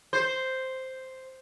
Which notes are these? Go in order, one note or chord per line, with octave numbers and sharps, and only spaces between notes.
C5